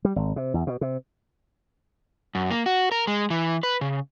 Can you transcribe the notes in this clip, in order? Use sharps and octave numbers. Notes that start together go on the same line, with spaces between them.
G3
G#1
C3
E2
B2
C3
F#2
A#3
F#4
A#4
G#3
E3
B4
C#3